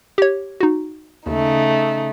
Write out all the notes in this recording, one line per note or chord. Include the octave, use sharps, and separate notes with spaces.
G4 C#5
D#4 F#4
D#2 C#3 A3 D#4